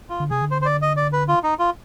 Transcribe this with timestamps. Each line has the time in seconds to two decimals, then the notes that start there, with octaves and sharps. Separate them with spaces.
0.10 F4
0.20 D3
0.30 C3 G#4
0.42 D3
0.51 C5
0.62 C5
0.66 D5
0.82 D#5
0.97 D5
1.13 B4
1.28 F4
1.43 D#4
1.59 F4